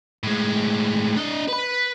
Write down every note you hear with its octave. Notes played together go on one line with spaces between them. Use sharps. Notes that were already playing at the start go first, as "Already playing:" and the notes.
A2 G#3
D4 D#5
B4 B5